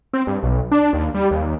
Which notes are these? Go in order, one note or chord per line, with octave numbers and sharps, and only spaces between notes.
C4
G2
B1
D4
D#2
G3
D#2